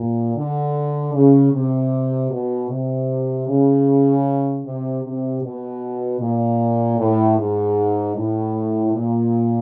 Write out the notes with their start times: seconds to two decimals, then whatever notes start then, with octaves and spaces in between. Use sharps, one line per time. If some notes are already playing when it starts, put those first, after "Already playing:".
Already playing: A#2
0.35 D3
1.14 C#3
1.52 C3
2.30 B2
2.69 C3
3.47 C#3
4.64 C3
5.03 C3
5.42 B2
6.20 A#2
6.98 A2
7.37 G#2
8.15 A2
8.93 A#2